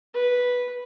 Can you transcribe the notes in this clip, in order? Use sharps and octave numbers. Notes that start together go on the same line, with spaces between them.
B4